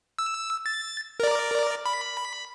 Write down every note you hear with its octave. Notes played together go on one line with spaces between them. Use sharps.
E6
A6
A#4 D5
B5